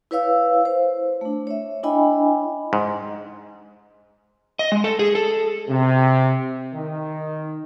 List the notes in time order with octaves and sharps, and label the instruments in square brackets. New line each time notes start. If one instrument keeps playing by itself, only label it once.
[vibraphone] E4 B4 C#5 F5 E6
C5
A3 D4
C#5 E5
D4 E4 D#5 G5 G#5 B5
[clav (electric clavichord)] G#2
[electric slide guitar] D#5
G#3
A4
G#4
A4
[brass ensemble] C3
D#3